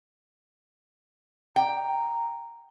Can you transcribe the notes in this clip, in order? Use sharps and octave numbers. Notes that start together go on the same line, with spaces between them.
G5 A#5